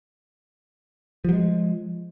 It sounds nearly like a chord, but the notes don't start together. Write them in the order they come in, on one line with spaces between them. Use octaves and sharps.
F3 F#3 G#3